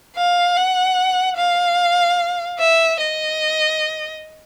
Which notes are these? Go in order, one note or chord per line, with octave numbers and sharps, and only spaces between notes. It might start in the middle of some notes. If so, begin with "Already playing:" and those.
F5
F#5
F5
E5
D#5